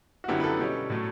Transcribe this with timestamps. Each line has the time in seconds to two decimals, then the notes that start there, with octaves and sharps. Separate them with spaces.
0.24 F#4
0.28 F#2 D3 F#3 B3 E4 G4
0.40 B4
0.44 A4
0.59 B2 G3 C#4
0.90 A2 F#3 A3